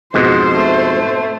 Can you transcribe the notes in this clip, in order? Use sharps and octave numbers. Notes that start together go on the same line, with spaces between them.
F2 G#2 B2 C5
A3